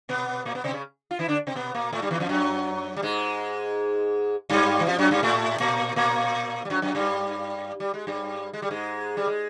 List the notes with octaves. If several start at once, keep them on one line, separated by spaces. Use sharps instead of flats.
B2 B3
A#2 A#3
B2 B3
C3 C4
C#3 C#4
F4
E3 E4
D3 D4
C3 C4
B2 B3
A#2 A#3
A2 A3
G2 G3
E2 E3
F2 F3
F#2 F#3
G3
G#2 G#3
G2 G3
E3
F2 F3
F#2 F#3
G2 G3
A2 A3
A#2 A#3
A#2 A#3
G3
F#2 F#3
F#2 F#3
G2 G3
G3
G#3
G2 G3
G#3
G3
G#2 G#3
G3
G#3